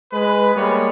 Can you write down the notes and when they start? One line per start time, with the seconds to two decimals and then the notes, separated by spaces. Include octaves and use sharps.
0.13 G#3 B4
0.54 G3 G#3 A#3 B3 C#5